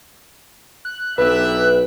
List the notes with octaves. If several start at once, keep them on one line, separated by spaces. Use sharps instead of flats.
F#6
B1 D4 G4 B4 E5